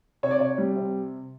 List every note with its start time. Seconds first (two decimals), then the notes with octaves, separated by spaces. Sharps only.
0.23 C3 C#5
0.31 D5
0.39 C3 C#5
0.58 G3
0.76 C3